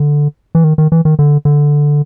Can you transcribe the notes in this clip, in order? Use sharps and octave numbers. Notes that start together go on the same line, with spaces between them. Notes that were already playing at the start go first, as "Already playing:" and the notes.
Already playing: D3
E3
D#3
D#3
E3
D#3
D3
D3